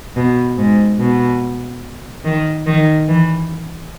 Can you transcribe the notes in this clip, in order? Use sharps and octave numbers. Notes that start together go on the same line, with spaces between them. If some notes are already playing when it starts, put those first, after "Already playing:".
B2
G#2
B2
D#3
D#3
E3